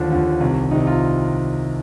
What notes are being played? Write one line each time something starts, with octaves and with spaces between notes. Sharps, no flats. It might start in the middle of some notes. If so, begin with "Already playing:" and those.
Already playing: D#2 D3 F3 D4
D#2 D3 F3
C2 C3 D#3
C2 C3 D#3 D#4
F4